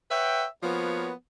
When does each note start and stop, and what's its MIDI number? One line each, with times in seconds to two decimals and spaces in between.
0.11 0.45 71
0.11 0.45 73
0.11 0.45 76
0.11 0.45 78
0.11 0.45 79
0.63 1.11 53
0.63 1.11 58
0.63 1.11 59
0.63 1.11 66
0.63 1.11 71
0.63 1.11 73